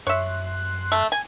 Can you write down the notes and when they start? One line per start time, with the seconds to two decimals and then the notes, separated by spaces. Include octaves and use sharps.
0.07 F#2 C#5 E5 C6 F#6
0.92 A3
1.12 G#5